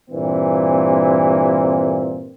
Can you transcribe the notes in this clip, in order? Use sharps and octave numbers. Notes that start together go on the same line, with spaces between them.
G2 A#2 E3 A#3 C4